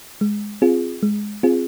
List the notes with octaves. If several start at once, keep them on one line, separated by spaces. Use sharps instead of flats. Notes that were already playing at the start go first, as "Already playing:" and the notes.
G#3
C4 F4 G#4
G#3
C4 F4 G#4